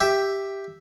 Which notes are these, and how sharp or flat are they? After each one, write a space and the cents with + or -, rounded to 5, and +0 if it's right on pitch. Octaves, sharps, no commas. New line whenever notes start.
G4 +0 E5 +0